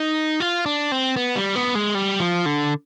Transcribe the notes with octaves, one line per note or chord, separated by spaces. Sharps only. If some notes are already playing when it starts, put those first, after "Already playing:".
Already playing: D#4
F4
D4
C4
B3
G3
B3
G#3
G3
F3
D3